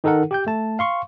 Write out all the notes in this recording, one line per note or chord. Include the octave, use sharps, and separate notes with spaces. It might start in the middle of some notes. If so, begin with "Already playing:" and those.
D#3 D#4 A4 A#4 F#5
G4 G5 G6
A3 A5
F5 C6 C#6